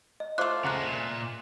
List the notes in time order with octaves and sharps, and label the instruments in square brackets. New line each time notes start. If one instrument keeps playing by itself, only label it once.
[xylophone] D#5
[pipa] A3 F4 [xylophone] C5 D6 F#6
[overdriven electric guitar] C#3 G#3 [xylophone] F#5 A#5 F#6
[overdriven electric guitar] A#2